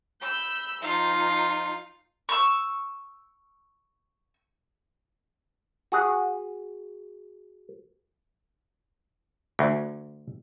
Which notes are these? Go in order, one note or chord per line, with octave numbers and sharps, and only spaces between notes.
B5 E6 G6
F3 D#4 F4 F5
C#6 E6
F#4 G#4 F#5
D2